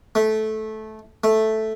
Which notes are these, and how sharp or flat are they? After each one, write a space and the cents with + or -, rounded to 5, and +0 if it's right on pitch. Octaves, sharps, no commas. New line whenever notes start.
A3 -15
A3 -5